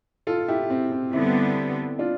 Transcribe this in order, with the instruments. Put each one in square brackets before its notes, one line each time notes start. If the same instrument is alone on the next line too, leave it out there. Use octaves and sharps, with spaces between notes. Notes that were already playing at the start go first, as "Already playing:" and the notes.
[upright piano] F4 A4
E4 G4
C4
C4
[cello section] D3 G3 B3 [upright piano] C4 E4
[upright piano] D4 F4